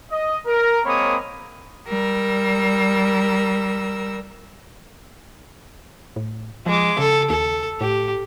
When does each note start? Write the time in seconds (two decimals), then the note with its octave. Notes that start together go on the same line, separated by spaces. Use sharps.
0.12 D#5
0.47 A#4
0.86 G#3 A#3 C4 C#5 B5 D#6
1.87 G3 A#4 E6
6.16 A2
6.66 F3 G#3 D6
6.98 C#3 A4
7.30 D#2 A4
7.81 A2 G4